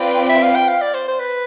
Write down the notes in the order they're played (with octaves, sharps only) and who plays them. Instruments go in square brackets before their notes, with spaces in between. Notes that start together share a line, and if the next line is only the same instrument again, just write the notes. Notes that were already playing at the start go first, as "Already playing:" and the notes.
Already playing: [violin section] C4 F4 B4 D5 G5
[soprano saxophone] E5
F5
G5
F5
D5
C5
C5
B4